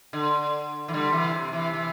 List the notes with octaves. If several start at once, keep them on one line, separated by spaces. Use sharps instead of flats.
D3
E3
D3 G3
C3 E3
C3
C3 E3
C3 E3